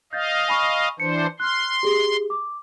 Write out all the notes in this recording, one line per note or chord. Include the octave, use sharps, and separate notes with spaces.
D#5 F5 G6 A6
G#5 B5 C#6
E3 D4 C5 C#7
C6 F6 F#6
G4 G#4
D6